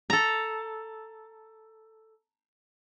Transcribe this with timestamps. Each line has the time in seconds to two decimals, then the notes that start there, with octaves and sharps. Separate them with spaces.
0.10 A4 A#5